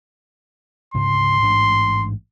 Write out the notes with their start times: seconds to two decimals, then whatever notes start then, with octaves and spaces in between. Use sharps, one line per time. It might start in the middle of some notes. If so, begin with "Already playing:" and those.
0.94 D2 G#2 C#3 C6
1.43 A1 G#2 D4